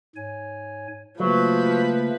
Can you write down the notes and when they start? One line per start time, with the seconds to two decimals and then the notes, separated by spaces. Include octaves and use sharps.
0.16 G#2 C#5 G#5
1.20 C#3 F3 F#3 A3 A#3 B4